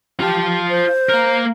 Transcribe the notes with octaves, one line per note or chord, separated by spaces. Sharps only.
F4 G4 A5
C5
A#3 A#4